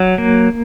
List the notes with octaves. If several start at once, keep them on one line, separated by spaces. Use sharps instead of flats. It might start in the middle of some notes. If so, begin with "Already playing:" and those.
Already playing: F#3
A#3